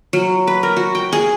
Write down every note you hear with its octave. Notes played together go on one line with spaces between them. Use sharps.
F#3
B4
A#4
F#4
G5
G#4